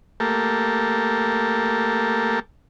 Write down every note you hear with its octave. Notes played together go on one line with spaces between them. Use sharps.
A3 A#3 G4 A4 A#4